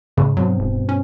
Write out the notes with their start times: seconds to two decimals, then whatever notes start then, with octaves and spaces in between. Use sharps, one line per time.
0.17 G#2 C#3
0.37 G2 B2 F#3 C4
0.59 D#1
0.89 C#4